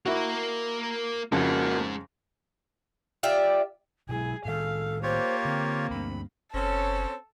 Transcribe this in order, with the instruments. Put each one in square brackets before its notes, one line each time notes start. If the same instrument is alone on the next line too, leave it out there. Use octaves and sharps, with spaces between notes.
[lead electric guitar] A#3 A#4 [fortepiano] E4 F#4
[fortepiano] F2 C#3 [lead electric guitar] G#3 D#4 [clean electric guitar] A#3 F#4 A4
[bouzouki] F4 G4 D5 E5
[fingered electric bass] B2 F#3 G#3 [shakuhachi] E4 [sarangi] G#4
[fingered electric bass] A2 D#3 [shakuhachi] A4 [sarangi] F5
[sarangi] A#3 [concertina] F4 G4 C#5 [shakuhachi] C5
[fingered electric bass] D3 [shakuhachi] C4
[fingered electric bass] D2 G2 [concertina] B5
[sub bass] F#1 [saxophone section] C4 C#4 [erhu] A4